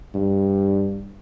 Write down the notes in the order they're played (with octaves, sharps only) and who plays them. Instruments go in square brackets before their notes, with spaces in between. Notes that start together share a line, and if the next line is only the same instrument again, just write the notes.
[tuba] G2